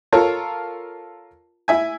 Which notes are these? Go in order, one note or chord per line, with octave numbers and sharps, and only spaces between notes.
F4 A4 A#4 C#5
E4 E5 G#5